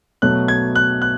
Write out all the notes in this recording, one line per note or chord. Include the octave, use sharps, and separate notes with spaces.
B2 F#3 A3 F#6
G#6
F#6
F#6